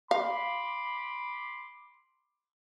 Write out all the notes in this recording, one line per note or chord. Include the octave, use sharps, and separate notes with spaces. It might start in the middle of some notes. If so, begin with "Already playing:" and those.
F5 B5 C6 D6